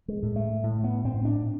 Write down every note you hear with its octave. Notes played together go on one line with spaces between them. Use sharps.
G#3
A2
A3
A2
B3
A2 C4
D4